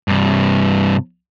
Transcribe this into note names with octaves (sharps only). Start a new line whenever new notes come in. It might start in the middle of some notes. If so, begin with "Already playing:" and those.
G2 C3